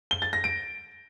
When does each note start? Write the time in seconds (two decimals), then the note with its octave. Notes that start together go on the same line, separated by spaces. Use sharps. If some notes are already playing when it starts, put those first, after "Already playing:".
0.11 G7
0.22 A6
0.33 A#6
0.44 D7